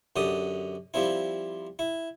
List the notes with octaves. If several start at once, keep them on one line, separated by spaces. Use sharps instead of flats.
F#2 D3 G4 D#6
F3 G3 C4 E4
E4